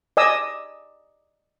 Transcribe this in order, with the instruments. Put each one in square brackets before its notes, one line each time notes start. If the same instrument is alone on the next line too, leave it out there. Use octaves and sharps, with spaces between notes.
[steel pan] D5 D#5 G#5 D#6 E6